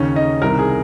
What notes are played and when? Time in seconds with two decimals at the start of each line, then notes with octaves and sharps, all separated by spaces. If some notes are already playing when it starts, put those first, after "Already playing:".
Already playing: D#2 C#3 C#4 C#5
0.16 D#4 D#5
0.42 C2 C3 D#3 A#4
0.59 G#4